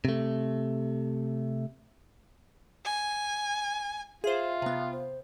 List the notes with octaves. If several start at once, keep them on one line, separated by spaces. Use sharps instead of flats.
C3 A3
G#5
F4 G#4 C5 E5
C3 B3
C5